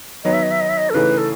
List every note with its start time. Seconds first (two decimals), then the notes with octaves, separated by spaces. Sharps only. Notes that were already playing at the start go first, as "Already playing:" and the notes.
0.24 D#3 F#3 B3 D#5
0.33 E5
0.43 D#5
0.51 E5
0.61 D#5
0.69 E5
0.78 D#5
0.90 A4
0.94 C#3 E3 A3 D#4 B4
1.18 A4